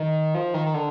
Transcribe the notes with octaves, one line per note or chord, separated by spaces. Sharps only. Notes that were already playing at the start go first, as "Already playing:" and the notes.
Already playing: D#3
F3
D#3
D#3
D3